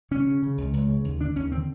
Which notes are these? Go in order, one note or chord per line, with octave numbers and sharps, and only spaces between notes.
C#3 C#4
C#3
C#3
C#2
C#2
C#3
D#2
D3 D4
D#2 C#4
D3 C4